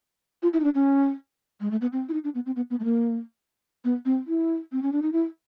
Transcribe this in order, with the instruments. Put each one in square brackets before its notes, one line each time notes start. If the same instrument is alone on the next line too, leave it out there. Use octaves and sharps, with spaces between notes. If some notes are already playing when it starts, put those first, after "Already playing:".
[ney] F4
E4
D#4
D4
C#4
G#3
A3
B3
C4
E4
D#4
D4
B3
C4
B3
B3
A3
A#3
B3
C4
E4
C4
C#4
D4
D#4
E4